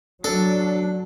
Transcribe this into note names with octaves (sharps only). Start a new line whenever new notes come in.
F#3 D4 A4